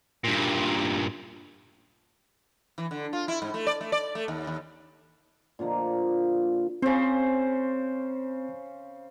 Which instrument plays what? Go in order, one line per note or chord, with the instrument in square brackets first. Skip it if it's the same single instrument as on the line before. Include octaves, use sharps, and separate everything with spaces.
[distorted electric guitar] G2 A#2
[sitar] E3
D3
F4
E4
G#2
A3
D5
A3
D5
A3
D#2
D#2
[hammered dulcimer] A#2 D3 F3 A#3
[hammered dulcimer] C#3 C5 [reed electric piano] C4